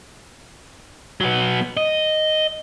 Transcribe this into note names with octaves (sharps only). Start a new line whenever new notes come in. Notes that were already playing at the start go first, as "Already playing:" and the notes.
F#3 B3
D#5